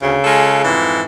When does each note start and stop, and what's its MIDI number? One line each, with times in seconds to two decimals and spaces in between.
0.02 0.17 38
0.02 0.70 49
0.24 0.62 56
0.24 0.62 65
0.24 0.62 69
0.65 1.03 41
0.65 1.03 44
0.65 1.03 52